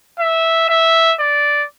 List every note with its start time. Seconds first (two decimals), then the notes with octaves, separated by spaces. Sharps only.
0.20 E5
0.69 E5
1.20 D5